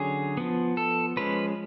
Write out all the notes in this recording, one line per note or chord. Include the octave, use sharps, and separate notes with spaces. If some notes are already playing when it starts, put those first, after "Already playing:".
Already playing: D3 F#3 C#4 G#4
F3 B3
A4
F3 G#3 C#4 B4